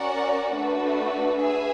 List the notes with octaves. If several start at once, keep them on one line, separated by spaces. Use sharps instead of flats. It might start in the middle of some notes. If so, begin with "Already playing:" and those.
Already playing: C#4 F#4 A#4 D5 F#5
A3 D4 F#4 B4
G#4 B4 E5 G#5